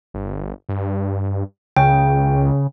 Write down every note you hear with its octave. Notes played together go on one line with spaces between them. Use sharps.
G1
G2
C#2 C#3 G5